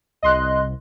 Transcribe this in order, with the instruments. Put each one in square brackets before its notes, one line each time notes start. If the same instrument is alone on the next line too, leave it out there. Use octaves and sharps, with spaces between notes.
[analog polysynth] C2 [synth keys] D#5 C6 F#6